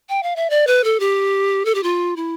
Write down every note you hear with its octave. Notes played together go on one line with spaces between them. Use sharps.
G5
F5
E5
D5
B4
A4
G4
A4
G4
F4
E4